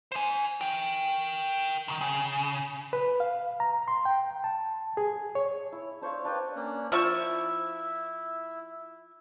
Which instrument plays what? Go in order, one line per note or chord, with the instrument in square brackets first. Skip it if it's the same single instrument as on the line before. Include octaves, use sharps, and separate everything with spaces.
[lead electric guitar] C5 G#5
A#4 G5
C3 D#3
C#3
[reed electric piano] B4
F5
A#5
C6
G5
A5
G#4
C#5
[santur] E4
D4 C5 C#5 F5
D4 B4 G5
[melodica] A#3 C#4 D4
[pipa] F3 E5 C#6 [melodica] E4